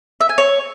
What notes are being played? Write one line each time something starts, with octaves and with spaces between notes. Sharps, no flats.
E5
G#5
C#5